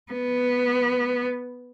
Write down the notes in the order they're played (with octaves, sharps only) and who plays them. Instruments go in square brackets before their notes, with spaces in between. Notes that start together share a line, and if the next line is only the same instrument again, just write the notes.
[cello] B3